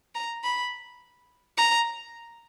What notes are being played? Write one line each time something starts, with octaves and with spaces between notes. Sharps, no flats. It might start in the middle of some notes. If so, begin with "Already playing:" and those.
A#5
B5
A#5